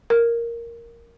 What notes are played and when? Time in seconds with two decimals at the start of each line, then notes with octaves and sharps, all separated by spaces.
0.10 A#4